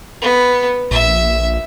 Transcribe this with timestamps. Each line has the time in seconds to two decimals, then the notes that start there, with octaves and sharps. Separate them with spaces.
0.22 B3
0.91 A#1 E5